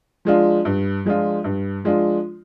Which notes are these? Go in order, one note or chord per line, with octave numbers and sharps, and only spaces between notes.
F3 G#3 D4 F4
G2
F3 G#3 D4 F4
G2
F3 G#3 D4 F4